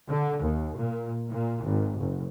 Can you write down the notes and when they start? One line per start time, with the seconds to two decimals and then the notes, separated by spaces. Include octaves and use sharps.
0.10 D3
0.42 D#2
0.77 A#2
1.29 A#2
1.64 G#1
1.99 F#1